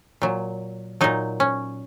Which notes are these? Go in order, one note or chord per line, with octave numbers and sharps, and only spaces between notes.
A#2 F#3
A#2 F#3 D#4
C#4